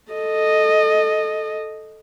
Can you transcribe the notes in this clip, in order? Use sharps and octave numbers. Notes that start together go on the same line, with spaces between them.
A4 D#5